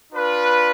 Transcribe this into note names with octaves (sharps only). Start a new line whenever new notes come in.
D4 F4 B4